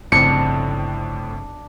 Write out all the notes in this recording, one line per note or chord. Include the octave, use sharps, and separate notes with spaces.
G1 F2 A2 C#3 C4 D4 C#7